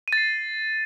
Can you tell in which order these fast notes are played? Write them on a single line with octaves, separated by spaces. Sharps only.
D#7 A6 C7